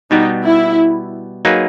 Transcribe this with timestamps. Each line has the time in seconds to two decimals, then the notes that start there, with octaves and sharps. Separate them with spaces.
0.11 B2 G3 B3 D#4
0.44 E4
1.45 F#3 A#3 D#4 G#4 B4